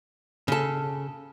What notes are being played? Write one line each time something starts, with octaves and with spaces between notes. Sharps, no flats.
C#3 A4